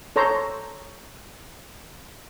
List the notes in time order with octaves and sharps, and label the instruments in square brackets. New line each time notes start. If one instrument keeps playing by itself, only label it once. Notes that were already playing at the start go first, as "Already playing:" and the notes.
[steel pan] A4 C5 C#5 A#5